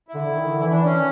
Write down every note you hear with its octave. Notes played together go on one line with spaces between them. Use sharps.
E4
D3
D3
D#3
D3
E3 E4
D4
C#4
D#3